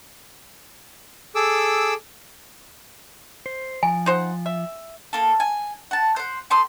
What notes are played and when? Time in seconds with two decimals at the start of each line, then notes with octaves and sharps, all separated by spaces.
1.35 G#4 A4 D6 E6
3.46 C5
3.83 F3 G#5
4.06 D#4 C5 F#5
4.46 E5
5.13 A#3 A4
5.40 G#5
5.91 F#5 A5
6.16 C5 F#5
6.50 G4 A4 C6 D#6